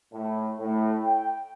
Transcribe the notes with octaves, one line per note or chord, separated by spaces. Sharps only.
A2
A2
G5